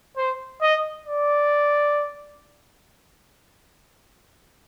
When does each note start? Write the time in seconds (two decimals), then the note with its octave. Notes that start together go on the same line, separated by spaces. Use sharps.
0.17 C5
0.62 D#5
1.06 D5